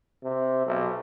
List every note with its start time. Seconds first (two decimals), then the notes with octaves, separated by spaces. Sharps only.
0.23 C3
0.67 B1